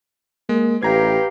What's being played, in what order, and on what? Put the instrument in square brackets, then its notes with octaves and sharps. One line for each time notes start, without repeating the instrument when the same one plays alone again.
[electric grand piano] G#3 [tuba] A#3
[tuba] A1 [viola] G4 F5 [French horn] B4 [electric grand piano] G5 A#5 G#6